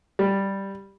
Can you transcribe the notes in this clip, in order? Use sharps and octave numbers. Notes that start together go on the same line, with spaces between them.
G3